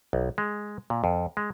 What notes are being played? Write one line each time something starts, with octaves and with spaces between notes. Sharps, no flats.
B1
G#3
A#2
F2
G#3